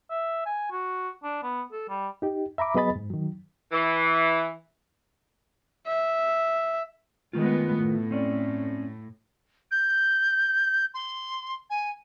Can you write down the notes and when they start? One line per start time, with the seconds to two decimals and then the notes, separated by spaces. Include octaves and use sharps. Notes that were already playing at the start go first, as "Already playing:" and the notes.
0.10 E5
0.46 G#5
0.71 F#4
1.23 D4
1.43 B3
1.72 A4
1.89 G3
2.22 D#4 G4
2.58 E5 A#5 B5 D6
2.75 F#3 B3 G#4 D#5 B5 A6
2.96 G#2
3.10 D#3 F#3
3.71 E3
5.87 E5
7.33 D#3 G#3 A3 B3 F4
7.77 A2
8.11 C4 C#4 D5
9.71 G6
10.94 C6
11.70 G#5